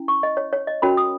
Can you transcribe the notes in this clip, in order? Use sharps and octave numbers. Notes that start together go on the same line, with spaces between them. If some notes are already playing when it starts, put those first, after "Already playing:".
Already playing: C#4 E4
C#6
D#5
C#5
C#5
D#5
C#4 F#4 A#4 C#5 B5
D#6